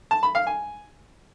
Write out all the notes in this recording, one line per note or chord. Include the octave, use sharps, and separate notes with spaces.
A5
B5
F5
G#5